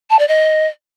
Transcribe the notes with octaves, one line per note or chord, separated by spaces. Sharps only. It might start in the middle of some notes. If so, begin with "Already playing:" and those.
A5
D5
D#5